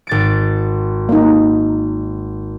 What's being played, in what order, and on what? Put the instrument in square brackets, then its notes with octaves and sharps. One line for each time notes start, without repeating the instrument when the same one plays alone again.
[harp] G#1 A6 D7
[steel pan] A#3 D#4